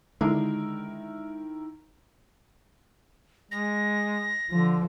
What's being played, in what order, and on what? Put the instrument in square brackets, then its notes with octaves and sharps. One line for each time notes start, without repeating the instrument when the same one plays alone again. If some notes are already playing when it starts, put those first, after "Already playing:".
[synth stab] D3 [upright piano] D#3 E4 A#4 [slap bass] G#3
[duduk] G#3 [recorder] A#6
[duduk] D3 [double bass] F3